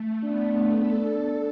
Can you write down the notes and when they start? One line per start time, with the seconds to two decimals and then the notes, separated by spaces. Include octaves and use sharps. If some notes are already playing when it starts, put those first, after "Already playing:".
Already playing: A3
0.23 B3 D4
0.76 D4 A4